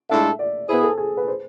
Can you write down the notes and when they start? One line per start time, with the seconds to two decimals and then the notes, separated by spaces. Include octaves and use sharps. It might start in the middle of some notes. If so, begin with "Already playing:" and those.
0.09 A2 G#3 D4 F4 A4 E5
0.39 D5
0.68 B2 B3 E4 G#4 C5
0.83 A4
0.98 G#4
1.17 B4
1.28 C5